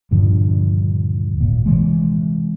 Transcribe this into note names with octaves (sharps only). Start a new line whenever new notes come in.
D#1 G2 D3 F3
G#1 A#2
C3 E3 G#3